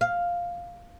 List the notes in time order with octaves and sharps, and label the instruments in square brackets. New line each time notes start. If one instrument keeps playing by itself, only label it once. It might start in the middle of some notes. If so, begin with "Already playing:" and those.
[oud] F5